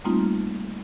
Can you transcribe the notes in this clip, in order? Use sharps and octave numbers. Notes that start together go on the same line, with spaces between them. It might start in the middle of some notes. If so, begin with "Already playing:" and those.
G3 A3 A#3 C4 D#4 F4